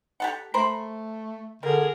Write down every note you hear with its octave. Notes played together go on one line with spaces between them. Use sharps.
G4 A4 F#5
A3 A#4 C5 B5
D3 G3 G#4 A#4